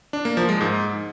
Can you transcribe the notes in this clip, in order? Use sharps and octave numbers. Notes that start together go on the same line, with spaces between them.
D4
A#3
F3
G#3
G#2